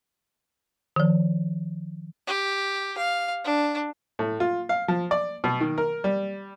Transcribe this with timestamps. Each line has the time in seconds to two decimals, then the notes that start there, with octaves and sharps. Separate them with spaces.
0.96 D#3 F3
2.27 G4
2.98 F5
3.44 D4
4.19 A2
4.40 F4
4.69 F5
4.88 F3
5.11 D5
5.44 B2
5.61 D#3
5.78 A#4
6.04 G3